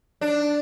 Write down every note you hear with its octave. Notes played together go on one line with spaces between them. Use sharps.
D4